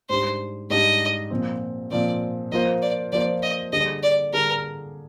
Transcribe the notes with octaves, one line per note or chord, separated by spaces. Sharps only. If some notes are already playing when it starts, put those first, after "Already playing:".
G#2 G3 D4 G4 C5
G#2 G3 D4 G4 D#5
A#2 F3 C4
A#2 F3 C4 D5
F3 A#3 F4 C5 D#5
D5
F3 A#3 F4 C5 D5
D#5
D3 G3 D4 G#4 D#5
D5
D3 G3 D4 G#4 A#4